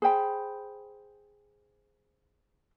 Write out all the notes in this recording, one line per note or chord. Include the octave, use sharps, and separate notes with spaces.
G#4 C5 G5 B5